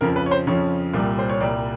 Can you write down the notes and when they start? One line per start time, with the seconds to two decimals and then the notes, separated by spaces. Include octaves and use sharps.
0.01 F2 C#3 F3 A#4
0.16 B4
0.26 C#5
0.31 C5
0.47 F2 C#3 F3 C#5
0.94 C2 A#2 G3
1.19 C5
1.30 C#5
1.40 C2 A#2 G3 D5